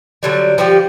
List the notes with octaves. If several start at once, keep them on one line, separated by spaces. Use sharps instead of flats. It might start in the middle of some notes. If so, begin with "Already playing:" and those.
D3 F#3 G3
F3 G3 G4